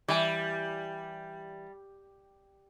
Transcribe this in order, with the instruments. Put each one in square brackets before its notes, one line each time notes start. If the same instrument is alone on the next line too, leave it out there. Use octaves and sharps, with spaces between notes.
[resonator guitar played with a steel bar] E3 G#5 [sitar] G3